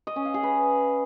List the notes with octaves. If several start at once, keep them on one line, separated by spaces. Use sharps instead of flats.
D#5
C#4
F5
G#4
B4